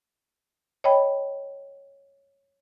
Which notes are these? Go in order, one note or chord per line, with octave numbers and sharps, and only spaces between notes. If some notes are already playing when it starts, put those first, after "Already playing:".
C#5 D#5 G5 B5